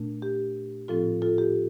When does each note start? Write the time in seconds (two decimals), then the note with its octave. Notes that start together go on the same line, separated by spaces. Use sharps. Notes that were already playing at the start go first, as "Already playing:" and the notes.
Already playing: A#2 A3 D4
0.22 G4
0.88 A2 F3 C4 F4 A4
1.22 F4 A4
1.38 G4